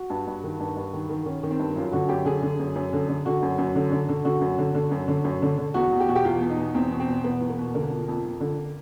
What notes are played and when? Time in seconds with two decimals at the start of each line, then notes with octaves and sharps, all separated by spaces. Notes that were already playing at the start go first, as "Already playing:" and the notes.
Already playing: F#4
0.10 G2
0.27 G2
0.44 D#3
0.60 G2
0.76 G2
0.93 D#3
1.10 D#3
1.26 D#3 C#4
1.43 D#3
1.51 C4
1.59 G2
1.75 F#2 F4
1.92 D3 F#4
2.09 F#2 G4
2.25 D3 G#4
2.43 D3
2.59 F#2
2.75 F#2
2.93 D3
3.09 D3
3.26 D3 F#4
3.42 F#2
3.58 F#2
3.75 D3
3.92 D3
4.09 D3
4.25 D3 F#4
4.41 F#2
4.58 D3
4.75 D3
4.91 F#2
5.08 D3
5.24 F#2
5.42 D3
5.58 D3
5.74 E2 F#4
5.92 E2
6.00 G4
6.09 B2 F#4
6.16 G4
6.25 E2 F4
6.41 B2
6.50 D#4
6.58 B2
6.75 E2 C4
6.92 B2
7.00 C4
7.08 B2
7.24 E2 B3
7.41 E2
7.49 A#3
7.58 B2
7.74 D3 A#3
7.91 F2
8.08 F2
8.25 F2
8.41 D3